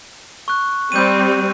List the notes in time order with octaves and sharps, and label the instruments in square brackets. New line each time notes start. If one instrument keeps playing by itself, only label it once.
[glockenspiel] C#6 F#6
[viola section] G3 C4 [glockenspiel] G6 D#7